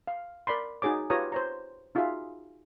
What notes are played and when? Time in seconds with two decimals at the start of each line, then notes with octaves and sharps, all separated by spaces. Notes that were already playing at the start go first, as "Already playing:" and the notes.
0.07 F5
0.47 A#4 D5 B5 C6
0.82 D#4 F#4 G#4 C#5 D6
1.10 F4 G4 B4 C#5 A#5 D#6
1.32 C5 C#5 A#5
1.95 D#4 F4 F#4 G#4 E5 F5